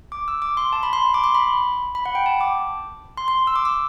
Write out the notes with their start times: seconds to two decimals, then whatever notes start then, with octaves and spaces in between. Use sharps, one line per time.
0.12 D6
0.28 E6
0.42 D6
0.57 C6
0.73 A5
0.83 B5
0.93 C6
1.14 D6
1.24 C6
1.35 B5
1.95 B5
2.06 F#5
2.15 G5
2.26 A5
2.41 D6
3.17 C6
3.28 C6
3.47 E6
3.56 D6
3.65 E6